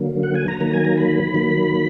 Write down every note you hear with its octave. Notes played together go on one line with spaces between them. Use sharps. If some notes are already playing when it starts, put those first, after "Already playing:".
Already playing: D3 F#3 A#3
F#5
G#5
A#5
D#3 F#3 A#3 A#5
G#5
A#5
B5
D#3 F#3 A#3